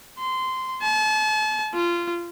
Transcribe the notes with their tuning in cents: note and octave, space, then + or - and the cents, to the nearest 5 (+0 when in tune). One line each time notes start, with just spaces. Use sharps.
C6 -15
A5 -40
F4 -20